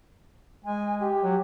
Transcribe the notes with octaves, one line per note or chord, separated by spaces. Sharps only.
G#3 G#5
G4
F#3